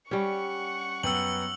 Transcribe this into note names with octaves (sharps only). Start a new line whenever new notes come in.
G3 C#4 G4 F#5 C#6
F#2 B3 G5 E6 F#7